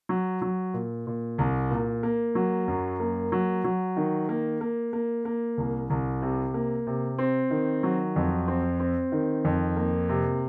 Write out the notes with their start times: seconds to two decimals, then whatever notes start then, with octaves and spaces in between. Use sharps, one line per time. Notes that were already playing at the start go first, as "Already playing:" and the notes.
0.09 F#3
0.42 F#3
0.74 A#2
1.07 A#2
1.38 C2
1.71 A#2
2.03 A#3
2.35 F#3
2.68 F#2
3.00 A#3
3.32 F#3
3.64 F#3
3.97 D#3
4.29 A#3
4.61 A#3
4.93 A#3
5.25 A#3
5.58 C2
5.90 C2
6.22 C3
6.54 A#3
6.87 C3
7.18 C4
7.51 D#3
7.83 F#3
8.16 F2
8.48 C4
8.80 C4
9.12 D#3
9.45 F2
9.77 A#3
10.09 C3